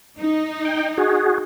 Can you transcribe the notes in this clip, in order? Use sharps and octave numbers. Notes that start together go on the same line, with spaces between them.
D#4
G5
F#4 G#4